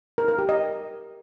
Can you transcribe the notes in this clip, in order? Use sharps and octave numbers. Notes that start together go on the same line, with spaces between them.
A#4
A#4
G4
D#5